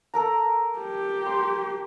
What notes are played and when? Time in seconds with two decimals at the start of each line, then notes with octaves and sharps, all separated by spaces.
0.14 A4 A#4 A#5
0.78 G4
1.26 C6